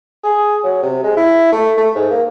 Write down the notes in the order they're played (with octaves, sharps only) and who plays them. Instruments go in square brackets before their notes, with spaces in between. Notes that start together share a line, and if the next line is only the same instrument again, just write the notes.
[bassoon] G#4
F#3
C3
G#3
E4
A3
A3
G#2
A#3